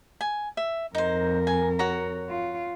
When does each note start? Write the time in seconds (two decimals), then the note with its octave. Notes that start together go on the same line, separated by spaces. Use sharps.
0.21 G#5
0.57 E5
0.95 F2 D#4 A#4 C5
1.47 G#5
1.79 F#4 C#5 A#5
2.30 F4